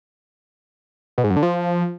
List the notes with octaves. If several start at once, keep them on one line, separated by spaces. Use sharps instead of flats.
B2
G#2
F#2
D3
F3